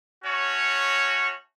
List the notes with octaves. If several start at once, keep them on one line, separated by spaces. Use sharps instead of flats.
A3 C#4 F#4 C#5